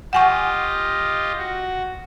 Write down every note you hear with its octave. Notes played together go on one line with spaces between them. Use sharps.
F4 G4 D#5 F#5 G#5 C#6
F#4